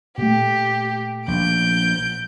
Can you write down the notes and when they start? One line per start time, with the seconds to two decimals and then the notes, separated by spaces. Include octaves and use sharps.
0.18 A#2 A3 G4
1.28 A#1 G6 D7